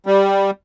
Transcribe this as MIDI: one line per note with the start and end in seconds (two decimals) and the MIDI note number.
0.06 0.51 55